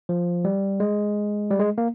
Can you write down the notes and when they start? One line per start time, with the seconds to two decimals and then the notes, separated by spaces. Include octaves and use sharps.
0.09 F3
0.45 G3
0.80 G#3
1.51 G3
1.60 G#3
1.78 A#3